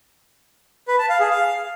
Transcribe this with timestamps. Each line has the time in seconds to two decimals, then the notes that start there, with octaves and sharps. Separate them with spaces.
0.88 B4
0.99 A5
1.09 F5
1.20 G#4
1.30 F5